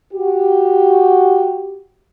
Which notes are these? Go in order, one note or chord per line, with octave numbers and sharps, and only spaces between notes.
F#4 G4